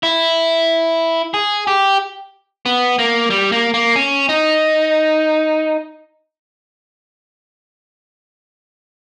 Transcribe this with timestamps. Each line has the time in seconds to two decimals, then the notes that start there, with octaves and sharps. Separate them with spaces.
0.03 E4
1.34 G#4
1.67 G4
2.66 B3
2.99 A#3
3.30 G3
3.52 A#3
3.74 A#3
3.96 C#4
4.29 D#4